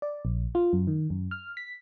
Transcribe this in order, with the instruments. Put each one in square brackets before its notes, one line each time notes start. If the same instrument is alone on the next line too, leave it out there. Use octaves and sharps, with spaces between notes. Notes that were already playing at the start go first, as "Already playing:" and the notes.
[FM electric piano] D5
A#1
F4
F#2
D#3
F#2
F6
B6